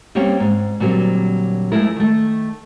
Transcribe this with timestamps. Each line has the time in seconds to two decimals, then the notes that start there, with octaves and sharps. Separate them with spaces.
0.15 G3 A#3 C4 C#4 C#5 G5
0.40 G#2
0.80 A#2 D3 F#3 G3 C4
1.72 F3 G#3 A3 E4 A#4
1.96 D#3 A3